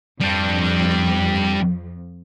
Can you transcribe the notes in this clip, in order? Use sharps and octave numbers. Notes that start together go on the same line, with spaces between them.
F2 G3 D4